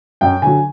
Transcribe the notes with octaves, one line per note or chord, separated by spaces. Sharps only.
F#2 G5
D3 F#3 G#5